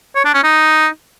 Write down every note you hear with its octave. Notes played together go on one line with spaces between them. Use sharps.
C#5
D4
C#4
D#4